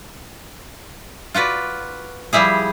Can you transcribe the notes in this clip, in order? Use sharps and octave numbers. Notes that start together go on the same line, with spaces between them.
F4 F#4 B4 D5
F3 G3 E4 G#4